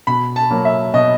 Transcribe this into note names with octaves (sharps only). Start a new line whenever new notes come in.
B2 B5
A5
F#3 A#3
E5
B2 D#5